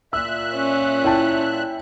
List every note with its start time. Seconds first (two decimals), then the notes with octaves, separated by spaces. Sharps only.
0.13 A#2 E5 E6 F#6
0.54 C#4
1.04 E4 G5 A5